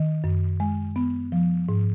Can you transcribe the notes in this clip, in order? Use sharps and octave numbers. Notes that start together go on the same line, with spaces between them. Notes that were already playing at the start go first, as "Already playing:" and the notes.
Already playing: D#3
F#2
G#3
B3
F3
G#2